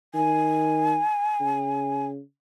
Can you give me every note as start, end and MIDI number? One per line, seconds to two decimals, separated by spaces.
0.15 0.99 51
0.15 2.06 80
1.40 2.20 49